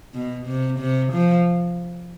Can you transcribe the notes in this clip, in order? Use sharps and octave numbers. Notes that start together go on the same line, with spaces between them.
B2
C3
C3
F3